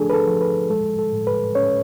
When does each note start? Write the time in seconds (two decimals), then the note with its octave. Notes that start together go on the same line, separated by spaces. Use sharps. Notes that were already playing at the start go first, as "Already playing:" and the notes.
Already playing: F3 A3 D4 G#4 A4
0.10 B4
0.13 A4
0.27 F3
0.41 B4
0.70 G#3 A4
0.99 A4
1.12 A2
1.27 B4
1.55 C#4 C#5